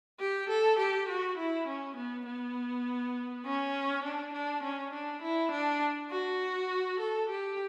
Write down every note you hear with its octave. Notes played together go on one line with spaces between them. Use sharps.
G4
A4
G4
F#4
E4
C#4
B3
B3
C#4
D4
D4
C#4
D4
E4
D4
F#4
A4
G4